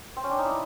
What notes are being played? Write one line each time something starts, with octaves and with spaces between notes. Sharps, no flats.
C4
C#4
D4
D#4
E4